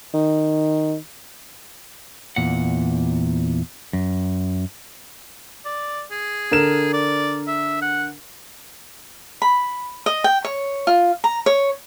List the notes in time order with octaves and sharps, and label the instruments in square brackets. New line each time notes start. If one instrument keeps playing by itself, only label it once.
[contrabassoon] D#3
[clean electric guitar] E2 A#2 F#5
F#2
[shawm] D5
G#4
[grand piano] D3 A#4 E7
[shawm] D5
E5
F#5
[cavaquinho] B5
D#5
G5
C#5
F4
A#5
C#5